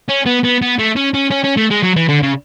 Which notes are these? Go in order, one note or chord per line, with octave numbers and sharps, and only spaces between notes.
C#4
B3
B3
B3
A3
C#4
C#4
C#4
C#4
A3
G#3
F#3
E3
D3
C#3